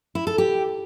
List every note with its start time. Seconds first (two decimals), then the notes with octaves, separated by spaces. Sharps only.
0.15 E4
0.27 A4
0.38 G4